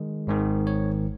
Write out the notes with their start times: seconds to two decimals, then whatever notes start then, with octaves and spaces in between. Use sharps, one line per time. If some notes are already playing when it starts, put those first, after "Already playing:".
Already playing: D#3 G#3
0.27 G#1 G#2 D#3
0.67 C#5